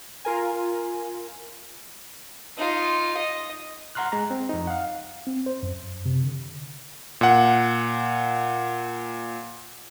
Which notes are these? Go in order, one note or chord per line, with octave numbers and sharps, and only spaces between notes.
F4 A#4 G#5
D#4 F4
D#5
F#5 A#5 C6 F6 F#6
G#3 A#5
C4
F2 D#4
F5 F#5
C4
C5
F#2
C3
D3
A#2 F#5